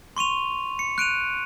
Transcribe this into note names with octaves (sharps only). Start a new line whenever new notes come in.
C6 C#6 D#7 F7
C#7
F#6 D7 D#7 F7